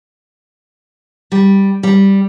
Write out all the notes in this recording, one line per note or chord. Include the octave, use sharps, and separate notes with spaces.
G3
G3